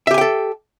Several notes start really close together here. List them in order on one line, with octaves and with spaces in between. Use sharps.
E5 G4 G#5 G5 A4